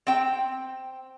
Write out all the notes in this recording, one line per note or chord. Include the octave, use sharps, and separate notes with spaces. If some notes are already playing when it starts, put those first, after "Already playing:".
C4 G5